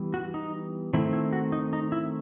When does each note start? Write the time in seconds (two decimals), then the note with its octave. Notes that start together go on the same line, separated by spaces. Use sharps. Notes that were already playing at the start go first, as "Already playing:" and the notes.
Already playing: E3 G3 B3
0.14 F#4
0.34 D#4
0.94 D#3 A3 C4 E4
1.13 E4
1.33 F#4
1.52 D#4
1.73 D#4
1.92 E4